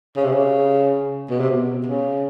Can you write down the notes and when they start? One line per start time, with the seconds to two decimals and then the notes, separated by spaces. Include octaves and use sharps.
0.16 C#3
0.24 C3
0.31 C#3
1.30 B2
1.40 C3
1.51 B2
1.86 C#3